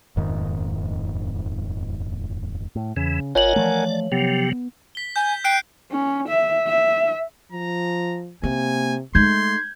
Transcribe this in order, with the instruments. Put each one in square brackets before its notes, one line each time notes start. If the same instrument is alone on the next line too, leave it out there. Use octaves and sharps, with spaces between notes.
[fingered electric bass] D#1 F2 G#2 D#3
[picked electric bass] A2
[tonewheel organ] E2 E3 [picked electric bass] C#3
[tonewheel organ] G1 F4 D#5 [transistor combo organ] A#4 F#5 G#5 [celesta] C#5 F#7
[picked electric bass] E3 F3 A3 [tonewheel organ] D5
[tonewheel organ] C3 F3 F#3 [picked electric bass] B3 [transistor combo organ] G4
[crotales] B6 G7
[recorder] G#5 [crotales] G6
[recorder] G5 [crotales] F#6 C7 D7
[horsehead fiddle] C#4
E5
E5
[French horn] F3 [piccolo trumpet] A#5
[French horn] C3 [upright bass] A#3 [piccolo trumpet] G#5
[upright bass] G#3 D#4 [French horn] A3 [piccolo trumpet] C6 [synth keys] G6 G#6